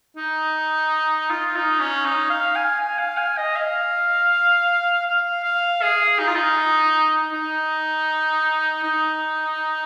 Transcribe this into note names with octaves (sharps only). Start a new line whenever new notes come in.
D#4
F4
D#4
C#4
D#4
F5
G#5
G#5
F5
G#5
D#5
F5
F5
F5
G#4
D#4
F4
D#4
D#4
D#4